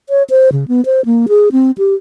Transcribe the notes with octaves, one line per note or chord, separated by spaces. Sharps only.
C#5
C5
C#3
B3
C5
A#3
G#4
C4
G4